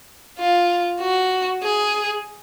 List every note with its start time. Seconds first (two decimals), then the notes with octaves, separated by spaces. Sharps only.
0.39 F4
1.01 F#4
1.63 G#4